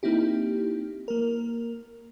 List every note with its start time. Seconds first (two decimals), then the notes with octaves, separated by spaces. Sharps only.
0.03 A#3 C4 D#4 E4 G4
1.08 A#3 A#4